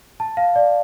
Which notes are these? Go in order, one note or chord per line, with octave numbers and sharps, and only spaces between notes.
A5
F5
D5